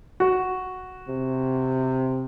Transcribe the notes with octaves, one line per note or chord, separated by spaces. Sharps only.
F#4
C3